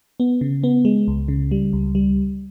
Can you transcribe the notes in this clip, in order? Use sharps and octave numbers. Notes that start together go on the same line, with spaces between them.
B3
C#3
B3
G#3
C#2
C#3
G3
C#2
G3